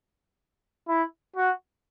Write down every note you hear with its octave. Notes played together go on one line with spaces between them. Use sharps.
E4
F#4